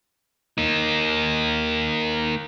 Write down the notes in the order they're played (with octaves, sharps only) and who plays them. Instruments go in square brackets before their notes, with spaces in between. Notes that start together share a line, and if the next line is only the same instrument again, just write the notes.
[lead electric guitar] A#3 D#4